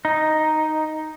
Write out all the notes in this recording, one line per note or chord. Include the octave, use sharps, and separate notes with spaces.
D#4